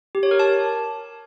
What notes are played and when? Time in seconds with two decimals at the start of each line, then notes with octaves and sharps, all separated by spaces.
0.15 G4
0.23 C#5
0.31 A#4
0.39 A5